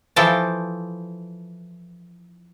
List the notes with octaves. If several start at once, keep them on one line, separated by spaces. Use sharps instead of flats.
E3 F3 A4 G5 A5